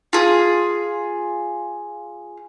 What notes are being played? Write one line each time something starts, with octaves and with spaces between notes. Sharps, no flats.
F4 G#4